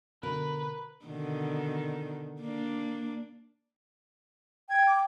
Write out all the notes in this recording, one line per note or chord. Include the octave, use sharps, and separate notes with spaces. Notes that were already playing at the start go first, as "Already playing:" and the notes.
B2 D3 A#4 B4
B2 D3 D#3
A#3 D4
G5 G#6
D6